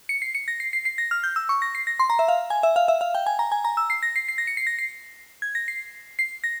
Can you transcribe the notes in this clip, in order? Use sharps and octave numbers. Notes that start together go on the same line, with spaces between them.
C#7
C7
C#7
A#6
C7
C7
C7
A#6
F6
G6
E6
C#6
A#6
C7
A#6
C6
A#5
E5
F5
G#5
E5
F5
E5
F5
G5
G#5
A#5
G#5
A#5
E6
C7
A#6
C7
C7
A#6
C#7
C7
A#6
C7
G#6
A#6
C7
C7
A#6